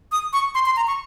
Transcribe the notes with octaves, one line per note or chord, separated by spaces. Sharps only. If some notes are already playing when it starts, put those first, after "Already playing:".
D#6
C#6
C6
C6
A#5
C#6